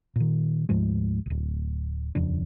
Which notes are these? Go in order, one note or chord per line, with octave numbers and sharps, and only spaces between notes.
A#2 D#3
D2 G#2 F3 G#3
D1 G#1
D#1 F2 C#3 D4